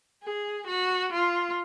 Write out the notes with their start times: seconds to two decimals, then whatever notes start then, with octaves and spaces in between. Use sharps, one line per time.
0.23 G#4
0.67 F#4
1.13 F4